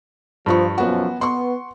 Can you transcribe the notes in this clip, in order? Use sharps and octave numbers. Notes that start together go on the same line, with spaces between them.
G2 F3 F4 C#6
F#2 B2 F3 B3 F#4
B3 C6 C#6